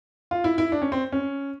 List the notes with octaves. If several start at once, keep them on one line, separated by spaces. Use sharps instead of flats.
F4
E4
E4
D4
C#4
C4
C#4